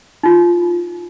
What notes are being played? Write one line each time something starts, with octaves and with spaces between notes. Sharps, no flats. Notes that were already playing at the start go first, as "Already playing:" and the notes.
D#4 F4